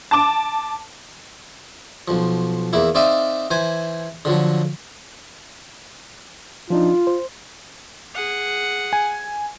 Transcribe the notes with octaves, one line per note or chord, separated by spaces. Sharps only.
A5 D6
B1 F3
E2 A#3 E4
C4 D#4 D5 E5 F5
E3 C5 G#5
D3 F3 F#3
F3 D4 D#4 F4
C5
G#4 F#5
G#5